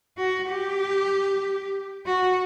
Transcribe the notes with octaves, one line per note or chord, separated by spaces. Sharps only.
F#4
G4
F#4